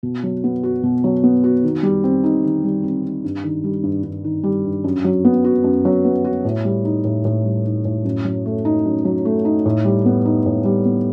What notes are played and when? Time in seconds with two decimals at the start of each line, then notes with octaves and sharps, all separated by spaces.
0.03 B2
0.23 F#3
0.44 B3
0.63 F#4
0.83 B2
1.04 F#3
1.23 B3
1.44 F#4
1.63 D#3
1.83 G3
2.04 C4
2.24 D#4
2.44 D#3
2.64 G3
2.84 C4
3.03 D#4
3.24 G2
3.44 D#3
3.64 G3
3.83 G2
4.04 G2
4.24 D#3
4.43 G3
4.65 G2
4.84 F#2
5.04 F#3
5.25 B3
5.44 F#4
5.64 F#2
5.85 F#3
6.05 B3
6.24 F#4
6.45 A2
6.65 G3
6.85 D#4
7.05 A2
7.25 A2
7.45 G3
7.65 D#4
7.85 A2
8.05 F#2
8.25 F#3
8.46 A3
8.65 D#4
8.85 F#2
9.05 F#3
9.25 A3
9.45 D#4
9.65 A2
9.85 G3
10.06 B3
10.25 D#4
10.46 A2
10.65 G3
10.85 B3